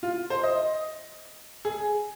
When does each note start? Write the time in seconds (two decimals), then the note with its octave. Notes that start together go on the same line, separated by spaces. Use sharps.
0.03 F4
0.30 C5
0.43 D#5
1.65 G#4